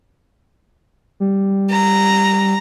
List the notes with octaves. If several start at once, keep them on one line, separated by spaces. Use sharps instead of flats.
G3
A#5